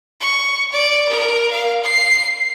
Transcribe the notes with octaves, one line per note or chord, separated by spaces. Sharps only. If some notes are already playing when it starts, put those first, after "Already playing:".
C#6
D5
A#4
F5
C7